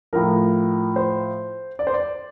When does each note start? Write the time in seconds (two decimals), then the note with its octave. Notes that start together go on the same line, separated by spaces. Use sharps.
0.13 A2 F3 A#4
0.96 C5
1.79 D5
1.87 C5
1.94 D5